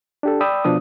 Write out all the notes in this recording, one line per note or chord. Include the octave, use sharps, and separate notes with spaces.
D4 G4 A4
D5 G5 B5 D#6 E6
B2 F3 D4 D#6